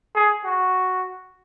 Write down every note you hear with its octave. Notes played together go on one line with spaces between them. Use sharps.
G#4
F#4